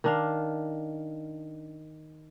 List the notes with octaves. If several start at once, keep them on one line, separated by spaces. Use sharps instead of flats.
D#3 D4 F5